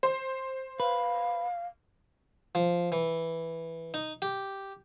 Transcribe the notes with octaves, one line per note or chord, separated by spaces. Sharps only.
C5
B4 F5
F3
E3
D#4
G4